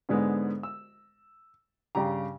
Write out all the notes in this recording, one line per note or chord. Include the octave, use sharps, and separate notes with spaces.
G#2 D3 G#3 B3
E6
G2 C#3 G4 A#5